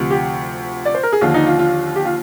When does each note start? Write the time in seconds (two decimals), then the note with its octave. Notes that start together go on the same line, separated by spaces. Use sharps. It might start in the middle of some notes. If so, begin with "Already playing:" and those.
Already playing: D2 C3 F3
0.11 G4
0.85 D5
0.95 C5
1.03 A#4
1.13 G#4
1.21 D#2 D3 F3 F4
1.34 D#4
1.47 F4
1.59 F4
1.96 G4
2.05 F4